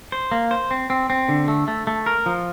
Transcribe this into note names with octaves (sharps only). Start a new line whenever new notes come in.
C5
A#3
C5
C4
C4
C4
D3
A3
A3
A3
A#4
F3